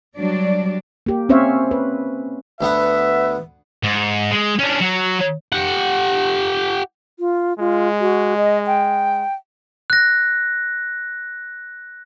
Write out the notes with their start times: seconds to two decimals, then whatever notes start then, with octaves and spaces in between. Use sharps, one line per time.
0.17 F#3 G3 D4 D5
1.06 A#3 G4
1.29 C4 C#4 C5 C#5 E5 F5
1.71 B4
2.61 D2 B3 B4 E5 F#5
3.83 G#2
4.31 G#3
4.59 C#4 D4
4.81 F#3
5.52 G4 F#5
7.20 F4
7.59 G#3 F4
8.01 F#4
8.38 D#5
8.66 G5
9.90 F#6 A#6